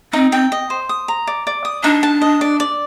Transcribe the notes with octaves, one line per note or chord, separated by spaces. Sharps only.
C4 D#4
C4 G5
D#5
C5
D#6
A#5
D5
D5
D#6
D4 D#4
A5
D#5
D5
D5